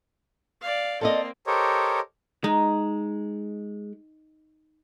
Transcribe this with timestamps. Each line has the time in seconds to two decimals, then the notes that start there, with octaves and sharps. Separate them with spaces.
0.61 D5 F5
1.01 A#3 C4 A4 D5 D#5
1.47 G4 A4 A#4 C5 C#5 D#5
2.44 G#3 D#4